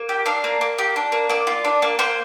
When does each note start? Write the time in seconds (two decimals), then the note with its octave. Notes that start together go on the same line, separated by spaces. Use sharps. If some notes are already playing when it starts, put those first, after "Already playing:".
Already playing: A#3
0.09 G4
0.26 D4 F5
0.44 A#3
0.61 A#3
0.78 G4
0.96 D4
1.12 A#3
1.29 A#3 D5
1.47 F4
1.65 D4
1.82 A#3
1.99 A#3 C5